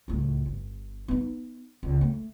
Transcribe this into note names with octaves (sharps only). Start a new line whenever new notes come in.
C#2 A2
G1
B3 D#4
C#2
A3